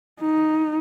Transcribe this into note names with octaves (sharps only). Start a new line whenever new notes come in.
D#4